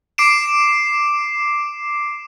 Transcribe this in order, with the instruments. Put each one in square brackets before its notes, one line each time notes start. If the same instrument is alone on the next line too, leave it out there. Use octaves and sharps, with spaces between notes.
[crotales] D6 C7 D7 E7